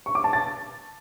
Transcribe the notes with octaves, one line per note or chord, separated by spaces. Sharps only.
C#6
D6
A5
A6